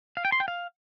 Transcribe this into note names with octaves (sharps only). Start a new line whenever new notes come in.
F5
G5
C6
G5
F5